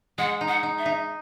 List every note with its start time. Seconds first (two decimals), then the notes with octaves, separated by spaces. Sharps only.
0.18 G#3 F#5
0.41 D#4
0.48 F#5
0.63 D#4
0.78 E5
0.86 D#4